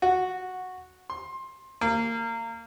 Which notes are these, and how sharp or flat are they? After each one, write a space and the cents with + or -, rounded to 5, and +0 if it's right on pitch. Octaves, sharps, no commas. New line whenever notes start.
F#4 -5
C6 +20
A#3 -25